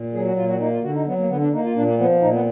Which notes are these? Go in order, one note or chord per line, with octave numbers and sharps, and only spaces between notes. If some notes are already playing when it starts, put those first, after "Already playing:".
Already playing: A#2
F#3 G#4
F#4
A#2 F4
F#4
A#3 D#4
F4
D3 F#4
D#4
F#3 B3
A#3
D3 B3
D4
A#3 D#4
F4
A#2 D4
A#3
F3 B3
A#2 D#4
B3